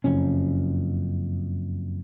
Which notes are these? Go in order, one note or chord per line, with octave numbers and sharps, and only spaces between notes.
F#1 F2 C#4